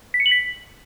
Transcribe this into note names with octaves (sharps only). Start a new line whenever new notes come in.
B6
C#7
F#7
B6